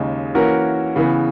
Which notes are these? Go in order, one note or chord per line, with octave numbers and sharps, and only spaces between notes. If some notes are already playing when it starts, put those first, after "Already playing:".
Already playing: D#2 C#3 G#3 D#4
E3 A#3 C#4 F#4 A#4
C#3 E3 B3